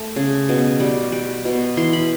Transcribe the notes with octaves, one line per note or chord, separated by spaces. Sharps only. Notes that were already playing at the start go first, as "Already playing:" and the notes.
Already playing: A3
C#3
B2
G3
G3
B2
E3 C6
B5